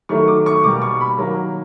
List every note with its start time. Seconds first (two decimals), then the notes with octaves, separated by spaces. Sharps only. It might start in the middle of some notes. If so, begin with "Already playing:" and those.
0.09 D#3 F#3 A3 C#6
0.28 D6
0.46 C#6
0.64 B2 G3 A#3 D6
0.82 C#6
1.01 B5
1.18 D#3 F#3 A#3